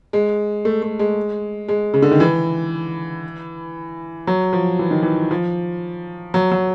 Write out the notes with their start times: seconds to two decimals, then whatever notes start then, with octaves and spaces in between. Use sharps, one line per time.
0.13 G#3
0.65 A3
0.82 A3
0.99 G#3
1.69 G#3
1.94 C#3
2.02 D3
2.12 D#3
2.20 E3
4.27 F#3
4.53 F3
4.79 E3
4.91 D#3
5.03 E3
5.31 F3
6.34 F#3
6.51 F#3